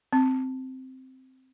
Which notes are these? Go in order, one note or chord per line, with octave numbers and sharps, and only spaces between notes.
C4